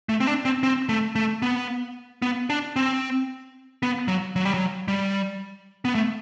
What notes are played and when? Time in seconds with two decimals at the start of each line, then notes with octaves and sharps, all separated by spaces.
0.09 A3
0.20 C4
0.27 D4
0.45 C4
0.63 C4
0.89 A3
1.16 A3
1.42 B3
2.22 B3
2.50 D4
2.76 C4
3.83 B3
4.08 F#3
4.36 F#3
4.45 G3
4.54 F#3
4.88 G3
5.85 B3
5.95 A3